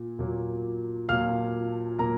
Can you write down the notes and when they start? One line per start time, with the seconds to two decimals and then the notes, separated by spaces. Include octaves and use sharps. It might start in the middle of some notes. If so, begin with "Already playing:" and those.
Already playing: A#2 A#3
0.19 A#2 F#3 A#3
1.09 A#2 F#3 A#3 F5 F6
1.98 A#2 F#3 A#3 A#4 A#5